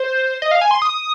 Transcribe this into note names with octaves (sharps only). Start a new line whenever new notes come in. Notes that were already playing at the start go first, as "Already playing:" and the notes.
Already playing: C5
D#5
F5
G#5
C6
D#6